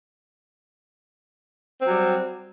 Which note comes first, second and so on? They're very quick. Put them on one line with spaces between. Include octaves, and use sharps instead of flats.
C4 F#3 G3